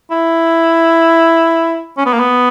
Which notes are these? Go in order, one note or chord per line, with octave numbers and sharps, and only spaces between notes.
E4
C#4
B3
A#3
B3